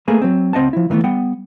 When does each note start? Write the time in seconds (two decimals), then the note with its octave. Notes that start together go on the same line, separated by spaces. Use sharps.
0.08 A3 A#3 G#4 A4 B4
0.22 F#3 C4
0.53 C#2 C4 D#5 F#5 A5
0.73 F3 E4
0.90 D#3 E3 G#3 A3 B3
1.04 G3 B3 F#5 G5